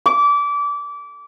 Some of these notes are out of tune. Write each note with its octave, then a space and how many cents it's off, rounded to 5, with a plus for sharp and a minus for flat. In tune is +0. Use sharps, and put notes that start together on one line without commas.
D6 -25